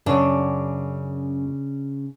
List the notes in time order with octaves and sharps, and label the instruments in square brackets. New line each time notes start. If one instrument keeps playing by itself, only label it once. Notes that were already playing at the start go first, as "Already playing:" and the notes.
[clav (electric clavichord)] F#2 C#5 [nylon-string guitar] C#3 D4